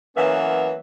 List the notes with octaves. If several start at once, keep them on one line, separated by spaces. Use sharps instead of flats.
E3 F#3 A#3 B3 C#4 E5